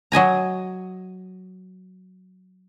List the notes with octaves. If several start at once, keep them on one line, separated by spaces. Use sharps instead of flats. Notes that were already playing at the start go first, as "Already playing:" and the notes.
F#3 D#5 G#5 A#5